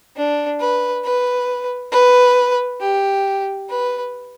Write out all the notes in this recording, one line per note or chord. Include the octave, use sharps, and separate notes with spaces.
D4
B4
B4
B4
G4
B4